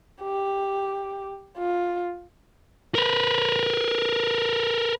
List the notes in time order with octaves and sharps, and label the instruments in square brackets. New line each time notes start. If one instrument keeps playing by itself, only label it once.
[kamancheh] G4
F4
[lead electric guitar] A#4 B4